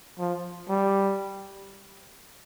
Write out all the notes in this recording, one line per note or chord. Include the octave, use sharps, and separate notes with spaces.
F3
G3